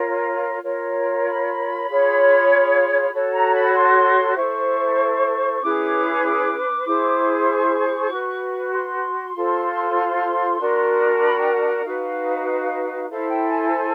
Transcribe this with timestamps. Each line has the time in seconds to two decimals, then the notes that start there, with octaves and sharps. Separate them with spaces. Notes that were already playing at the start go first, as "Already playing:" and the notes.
Already playing: F4 A#4 C#5
0.62 F4 A#4 C#5
1.25 B5
1.87 F4 G#4 C#5
3.11 F#4 A4 C#5
3.33 A#5
3.53 B5
3.74 C6
4.36 E4 A4 C5 C#6
5.60 C#4 E4 G#4 B4 D6
6.23 D6
6.85 E4 G#4 C5
7.48 C#6
8.11 F#4 B4
8.73 C6
9.34 F4 A4 C5
10.59 D4 F#4 A#4
11.22 B5
11.37 G5
11.52 F#5
11.68 F#5
11.83 D#4 F#4 B4 F5
13.09 E4 A4 C5 F5
13.29 G5
13.49 G#5